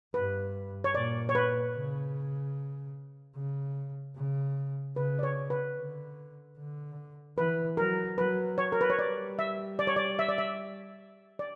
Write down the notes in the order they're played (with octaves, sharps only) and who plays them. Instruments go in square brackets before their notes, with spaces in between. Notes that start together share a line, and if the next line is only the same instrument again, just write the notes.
[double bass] G2 [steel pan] B4
[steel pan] C#5
[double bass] A#2 [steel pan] D5
[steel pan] C#5
B4
[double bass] C#3
C#3
C#3
[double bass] C#3 [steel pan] B4
[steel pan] D5
C#5
B4
[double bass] D3
D3
[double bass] E3 [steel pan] B4
[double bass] F#3 [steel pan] A#4
[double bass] F#3 [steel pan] B4
[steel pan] C#5
A#4
B4
C#5
[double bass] G3 [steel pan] D5
[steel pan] E5
D5
C#5
D5
E5
D5
E5
D5